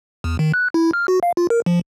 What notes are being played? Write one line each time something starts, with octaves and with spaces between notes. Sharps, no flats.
E2
D#3
F#6
E4
F6
F#4
F5
F4
A#4
F3